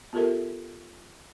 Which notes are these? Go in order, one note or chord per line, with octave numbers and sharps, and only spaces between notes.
B3 F4 G4 A4 A#4 E5